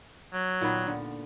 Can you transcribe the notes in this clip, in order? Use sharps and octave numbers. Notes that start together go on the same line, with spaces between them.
F#3
A#2 D#3 B3
D3